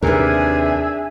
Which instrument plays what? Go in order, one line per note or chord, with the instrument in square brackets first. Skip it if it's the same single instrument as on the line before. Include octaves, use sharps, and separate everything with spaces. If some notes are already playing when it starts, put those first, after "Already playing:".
[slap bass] D#2 C3 [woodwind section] D4 E5 [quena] G#4 [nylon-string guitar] A#4 B4